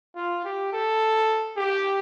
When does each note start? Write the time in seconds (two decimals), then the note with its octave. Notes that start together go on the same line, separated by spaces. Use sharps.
0.16 F4
0.45 G4
0.73 A4
1.57 G4